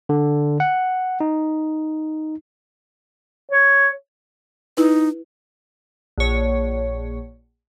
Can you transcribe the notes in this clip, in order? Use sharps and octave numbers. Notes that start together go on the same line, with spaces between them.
D3
F#5
D#4
C#5
D#4 E4 B4
A#1 C#5